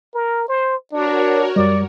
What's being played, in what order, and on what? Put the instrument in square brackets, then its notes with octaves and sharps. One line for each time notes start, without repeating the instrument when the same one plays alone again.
[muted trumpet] A#4
C5
[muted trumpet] D4 [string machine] F#4 A#4 C#5
[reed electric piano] F#2 G3 [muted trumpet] D5